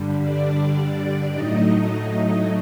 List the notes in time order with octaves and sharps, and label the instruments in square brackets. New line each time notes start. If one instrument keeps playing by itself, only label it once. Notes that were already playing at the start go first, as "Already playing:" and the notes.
Already playing: [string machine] G2 D3 G3
D4 D5
A2 F#3 A3 D#4 D#5
D#4 D#5